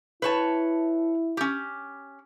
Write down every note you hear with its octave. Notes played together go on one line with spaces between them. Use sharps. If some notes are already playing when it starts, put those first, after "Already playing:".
E4 B4 C#5 A5
C#4 G4